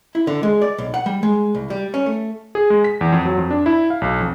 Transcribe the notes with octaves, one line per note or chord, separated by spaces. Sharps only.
E4
D3
G#3
D5
B1
F#5
G3
G#3
C2
G3
C#4
A3
G#4
G#3
B6
E2
F2
F#3
F2
D4
E4
F5
B1
F2